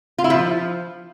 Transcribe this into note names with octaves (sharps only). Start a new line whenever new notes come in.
F4
E4
F3